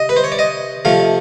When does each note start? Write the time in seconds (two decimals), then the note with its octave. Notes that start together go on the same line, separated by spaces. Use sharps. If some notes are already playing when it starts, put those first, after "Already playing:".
Already playing: C3 D#5
0.09 B4
0.17 C5
0.24 C#5
0.32 D5
0.39 D#5
0.85 C3 F3 A3 F5